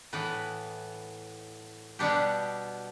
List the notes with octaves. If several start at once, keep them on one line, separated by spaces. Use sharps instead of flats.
A2 E3 B3
B2 G3 B3 D4 G4